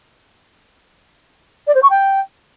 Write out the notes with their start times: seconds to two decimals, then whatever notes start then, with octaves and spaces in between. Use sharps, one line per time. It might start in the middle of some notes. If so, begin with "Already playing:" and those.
1.67 D5
1.75 C5
1.82 C#6
1.90 G5